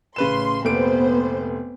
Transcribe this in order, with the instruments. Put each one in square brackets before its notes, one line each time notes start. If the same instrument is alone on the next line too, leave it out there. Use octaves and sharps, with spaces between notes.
[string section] A1 C6 [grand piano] C#3 B4 E7
[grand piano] F1 A#2 D7 [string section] B3 C5